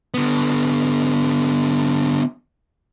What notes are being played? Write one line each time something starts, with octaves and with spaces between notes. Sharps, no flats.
D3 B3